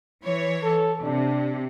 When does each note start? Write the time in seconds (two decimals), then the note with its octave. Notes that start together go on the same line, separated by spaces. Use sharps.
0.25 E3 C#5
0.64 A4
1.04 C3 D4